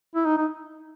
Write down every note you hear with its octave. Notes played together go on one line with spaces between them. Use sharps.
E4
D#4
D#4